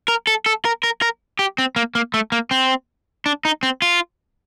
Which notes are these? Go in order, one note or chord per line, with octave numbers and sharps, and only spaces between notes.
A#4
A4
A4
A#4
A#4
A#4
G4
C4
A#3
A#3
A3
A#3
C4
D4
D#4
C4
F4